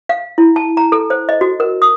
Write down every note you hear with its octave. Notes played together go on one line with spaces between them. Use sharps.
F5
E4
A5
A#5
A4
C5
D#5
F#4
A#4
D#6